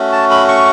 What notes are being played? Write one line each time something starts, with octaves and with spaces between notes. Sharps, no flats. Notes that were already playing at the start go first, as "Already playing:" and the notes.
Already playing: A3 C#4 F#4
A5
B5
C#6